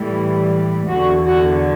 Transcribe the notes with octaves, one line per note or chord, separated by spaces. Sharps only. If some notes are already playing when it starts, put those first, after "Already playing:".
Already playing: A2 E3 G3
E2 D3 F#3 F#4
F#4